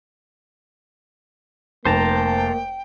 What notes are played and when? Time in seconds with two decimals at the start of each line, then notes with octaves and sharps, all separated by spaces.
1.85 F1 A#3 C5 G5 A5 A#5